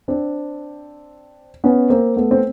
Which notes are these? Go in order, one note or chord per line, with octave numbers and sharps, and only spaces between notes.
C4 D4
B3 C#4
A#3 C4
A3 B3
C4